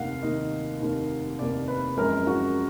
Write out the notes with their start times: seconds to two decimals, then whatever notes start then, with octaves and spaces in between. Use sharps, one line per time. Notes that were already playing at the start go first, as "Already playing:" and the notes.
Already playing: F1 D#2 D#3 A#3 F5 F#5
0.23 F1 D#2 D#3 A#3 D#5
0.81 F1 D#2 D#3 A#3
1.39 F1 D#2 D#3 A#3 D5
1.68 B4
1.97 F#2 F3 G#3 A#4
2.27 F#4